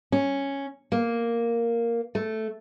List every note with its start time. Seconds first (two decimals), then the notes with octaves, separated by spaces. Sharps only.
0.12 C#4
0.92 A#3
2.15 A3